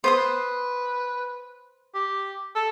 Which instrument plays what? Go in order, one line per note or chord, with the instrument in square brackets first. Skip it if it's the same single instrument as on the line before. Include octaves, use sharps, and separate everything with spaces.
[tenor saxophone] B3 [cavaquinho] C5 C6 D#6
[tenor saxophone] B4
G4
A4